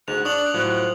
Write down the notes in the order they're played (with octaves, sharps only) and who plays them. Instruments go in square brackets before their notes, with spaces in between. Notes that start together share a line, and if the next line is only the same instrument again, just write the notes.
[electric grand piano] D2 [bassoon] G#2 [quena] F#6 [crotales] F7
[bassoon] D4 [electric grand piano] C#6 [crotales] D#6 F7 F#7
[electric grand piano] A2 F#3 [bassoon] F3